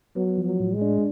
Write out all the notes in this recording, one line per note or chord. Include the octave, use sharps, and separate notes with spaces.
F#3 B3
F3
F#3
A2
G#3
D4